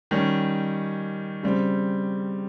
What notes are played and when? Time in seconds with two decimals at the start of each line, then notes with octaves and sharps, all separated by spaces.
0.11 D#3 G3 C#4
1.43 C#3 G3 C4